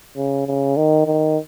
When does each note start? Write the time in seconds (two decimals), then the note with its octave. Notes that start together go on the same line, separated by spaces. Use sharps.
0.17 C#3
0.47 C#3
0.77 D#3
1.06 D#3